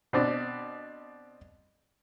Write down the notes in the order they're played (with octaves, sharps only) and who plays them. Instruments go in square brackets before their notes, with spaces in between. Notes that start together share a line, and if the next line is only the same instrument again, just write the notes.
[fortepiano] B2 C4 D4